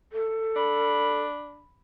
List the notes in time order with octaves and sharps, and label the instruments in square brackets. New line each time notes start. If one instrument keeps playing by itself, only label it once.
[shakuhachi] A4
[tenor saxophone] D4 [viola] B5